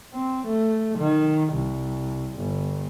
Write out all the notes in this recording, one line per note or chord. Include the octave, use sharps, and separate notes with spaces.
C4
A3
D#3
C2
G1